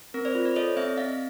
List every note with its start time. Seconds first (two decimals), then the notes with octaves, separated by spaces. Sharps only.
0.14 C4 A#4
0.25 C5 D5
0.35 F4
0.45 C5 D5
0.56 A4 C#5 D#5
0.77 C4 D5 E5
0.97 C4 D#5 F5